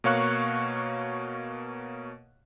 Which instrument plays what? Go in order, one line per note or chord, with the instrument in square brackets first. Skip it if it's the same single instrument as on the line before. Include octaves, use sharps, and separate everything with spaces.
[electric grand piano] B2 A#3 C#5 F5 C#6 F#6